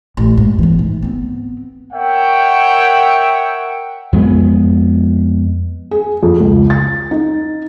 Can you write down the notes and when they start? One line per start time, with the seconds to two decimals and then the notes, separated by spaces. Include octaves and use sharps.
0.17 A1
0.37 G#2
0.59 E3 B3
0.79 G#2
1.02 B3 C4
1.93 A#4 C#5 E5 F#5 G5
4.13 F2 G#3 B3
5.91 G#4
6.23 F2
6.40 C#2
6.70 A6
7.11 D#4